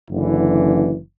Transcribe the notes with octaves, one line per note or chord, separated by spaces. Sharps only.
F#1 F#2 D3 E3